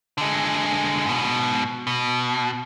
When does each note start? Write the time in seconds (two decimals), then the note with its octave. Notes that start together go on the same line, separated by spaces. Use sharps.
0.18 D3 G#3
1.06 G#2 B2
1.87 B2